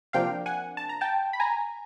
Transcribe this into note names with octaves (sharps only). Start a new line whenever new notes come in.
C3 F3 A#3 D4 F5 G5
F#5 G#5
A5
A#5
G5 A5
B5
G#5 A#5